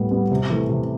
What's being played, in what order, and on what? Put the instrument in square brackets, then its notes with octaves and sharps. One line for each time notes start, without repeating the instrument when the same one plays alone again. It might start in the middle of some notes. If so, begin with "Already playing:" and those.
Already playing: [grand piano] A2 G3 B3
G3 B3
C3
E3 A3
C3